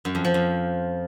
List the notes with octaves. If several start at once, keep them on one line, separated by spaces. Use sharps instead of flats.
F#2
F2
F3
F2